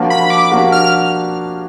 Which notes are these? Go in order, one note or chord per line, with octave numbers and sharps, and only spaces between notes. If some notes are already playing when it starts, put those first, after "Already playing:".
Already playing: F3 A#3 D4 F#4
B5
D6
F3 A#3 D4 F#4
F6